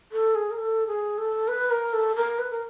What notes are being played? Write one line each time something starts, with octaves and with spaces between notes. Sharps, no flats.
A4
G#4
A#4
A4
G#4
A4
B4
A#4
A4
A#4
B4
A#4